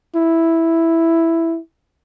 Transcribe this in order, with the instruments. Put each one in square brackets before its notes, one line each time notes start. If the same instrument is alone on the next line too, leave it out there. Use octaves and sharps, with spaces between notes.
[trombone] E4